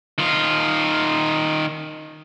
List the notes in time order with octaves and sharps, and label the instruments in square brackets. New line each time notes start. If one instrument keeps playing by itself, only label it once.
[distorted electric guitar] D#3 F4